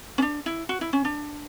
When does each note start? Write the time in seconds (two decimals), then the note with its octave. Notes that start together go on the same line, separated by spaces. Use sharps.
0.18 C#4
0.22 D4
0.46 E4
0.69 F#4
0.81 E4
0.93 C#4
1.05 D4